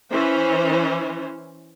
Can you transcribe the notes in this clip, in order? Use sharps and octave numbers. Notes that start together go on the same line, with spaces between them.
E3 C#4 C5